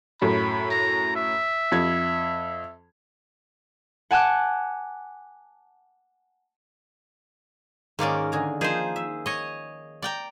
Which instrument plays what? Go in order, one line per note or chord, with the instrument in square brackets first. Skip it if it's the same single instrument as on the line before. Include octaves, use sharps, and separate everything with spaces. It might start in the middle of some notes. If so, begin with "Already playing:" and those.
[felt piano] F#2 A2 [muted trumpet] B5
[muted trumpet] A#5
E5
[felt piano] F2 G#6
[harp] F#5 G#5 A5 D6 F#6
[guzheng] G#2 C#4 [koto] D#3 A#3 D5
[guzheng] D3 G#4 A#5
[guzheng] F3 A#3 D#4 [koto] G#4 C5
[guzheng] E5
[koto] C#5 D#5
D5 G5 A#5